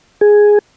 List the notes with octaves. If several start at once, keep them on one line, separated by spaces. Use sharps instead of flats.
G#4